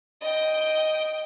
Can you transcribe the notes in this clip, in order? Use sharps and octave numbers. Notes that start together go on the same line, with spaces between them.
D#5 G5